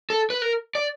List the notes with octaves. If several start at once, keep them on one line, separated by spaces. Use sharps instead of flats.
A4
B4
A#4
D5